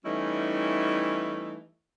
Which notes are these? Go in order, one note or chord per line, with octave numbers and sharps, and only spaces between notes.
E3 G3 A3 C#4 D#4 E4